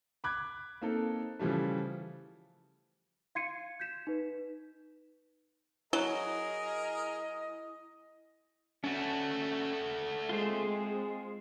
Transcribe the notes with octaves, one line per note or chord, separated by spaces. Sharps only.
B5 D6 F#6 G#6
A#3 C4 D#4 A4
C#3 E3 F3 G3 A3
F5 C6 G#6 C7 C#7 D#7
G6 G#6 B6 E7
D#4 B4
F#3 E4 G#4 A#4 D#5
A3 C#4 F#4 A5
G#3 C4 F4 G#4 C5